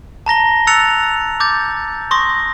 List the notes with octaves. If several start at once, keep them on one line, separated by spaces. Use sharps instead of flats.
A5 A#5 A#6 G7
E6 F#6 A6 C#7 F7
D6 G6 A6
C6 C#6 D#6 A#6